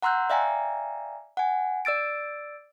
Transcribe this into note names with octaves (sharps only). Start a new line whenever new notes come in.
F#5 A#5 C6 E6 F#6 G6
D5 E5 F5 G5 G#5 A#5
F#5 G#5
D5 E6 A6 D7